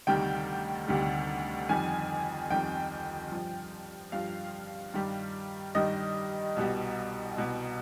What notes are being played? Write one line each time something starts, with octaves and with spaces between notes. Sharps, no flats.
D2 C3 D#3 G3 G5
D2 C3 D#3 G3
F2 D#3 G3 G#5
F2 D#3 G3 G5
G2 F3
G2 F3 F5
G2 D#3 G3
G2 D#3 G3 D#5
C2 B2 G3
C2 B2 G3